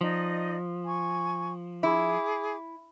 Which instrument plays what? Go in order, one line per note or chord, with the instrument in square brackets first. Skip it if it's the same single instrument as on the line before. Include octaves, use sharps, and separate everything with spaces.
[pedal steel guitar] F3 [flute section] D#4 D5 D#5
[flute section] G#5 C#6
[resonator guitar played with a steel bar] E4 [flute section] G#4 D6